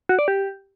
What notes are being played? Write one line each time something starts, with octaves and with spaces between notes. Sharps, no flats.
F#4
D5
G4